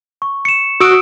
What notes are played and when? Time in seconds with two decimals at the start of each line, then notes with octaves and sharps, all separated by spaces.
0.22 C#6
0.45 C#7 E7
0.80 F#4 D#6 E6 D7